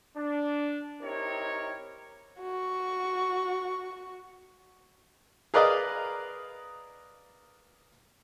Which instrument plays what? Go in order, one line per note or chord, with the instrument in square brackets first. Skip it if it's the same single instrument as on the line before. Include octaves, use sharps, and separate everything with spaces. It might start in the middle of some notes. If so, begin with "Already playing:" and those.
[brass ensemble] D4
C4 D#4 E4 G4 A#4 C#5
[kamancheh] F#4 C#6
[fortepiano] G#4 A#4 B4 D5 D#5 F5